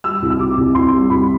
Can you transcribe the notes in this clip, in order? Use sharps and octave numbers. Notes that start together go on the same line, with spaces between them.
G3 E6
C2
E6
C3 D6
C2
C2 C6
G3
C2 B5